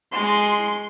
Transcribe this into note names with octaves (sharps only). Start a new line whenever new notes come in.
G#3 C6